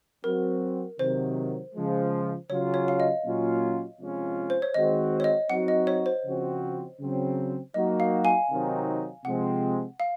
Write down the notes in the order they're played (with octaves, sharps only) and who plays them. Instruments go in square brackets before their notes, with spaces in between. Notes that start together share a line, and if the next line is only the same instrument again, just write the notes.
[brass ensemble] F#3 C4 F#4 [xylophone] A#4
[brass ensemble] C3 D#3 F#3 [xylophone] C5
[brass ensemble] C#3 F3 G#3
[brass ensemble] C#3 F#3 C#4 F4 [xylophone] C#5
[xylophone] C#5
F5
D#5
[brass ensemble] A#2 F#3 C#4 F4
C3 F3 G#3 C#4 F4
[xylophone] C5
C#5
[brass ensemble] D#3 G#3 C4 F#4 [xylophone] D#5
[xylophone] C#5
D#5
[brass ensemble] F#3 C4 D#4 F#4 [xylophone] F#5
[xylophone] D#5
C#5
C5
[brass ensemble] C#3 F3 C4 F#4
C#3 F#3 C4
[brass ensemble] F#3 A#3 D#4 F#4 [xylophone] D#5
[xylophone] F5
F5 G#5
[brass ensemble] C3 D#3 F#3 C4 D#4
[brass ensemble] C3 F3 G#3 C4 [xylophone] F#5
[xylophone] F5